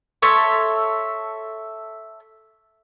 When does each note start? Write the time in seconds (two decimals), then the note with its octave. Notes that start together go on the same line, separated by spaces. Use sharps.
0.22 A4 C#5 E5 C6